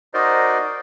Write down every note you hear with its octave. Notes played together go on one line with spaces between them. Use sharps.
D#4 F#4 A#4 C5 D5 D#5